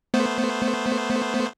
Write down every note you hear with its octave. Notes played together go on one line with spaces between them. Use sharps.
A3 B3 C5